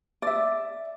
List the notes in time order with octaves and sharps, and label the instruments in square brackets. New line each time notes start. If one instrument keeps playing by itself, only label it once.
[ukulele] D5 E5